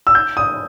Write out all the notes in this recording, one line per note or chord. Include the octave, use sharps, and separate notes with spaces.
E6
G6
D#6